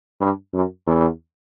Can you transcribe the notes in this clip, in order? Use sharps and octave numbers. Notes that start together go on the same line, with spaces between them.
G2
F#2
E2